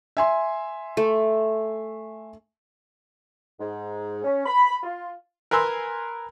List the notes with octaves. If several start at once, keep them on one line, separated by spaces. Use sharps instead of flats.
E5 G#5 C6
A3
G#2
C#4
B5
F4
A#4 B4 G#5 C6 E6